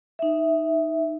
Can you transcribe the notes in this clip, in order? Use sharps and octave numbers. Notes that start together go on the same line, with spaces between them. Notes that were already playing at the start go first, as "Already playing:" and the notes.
D#4 E5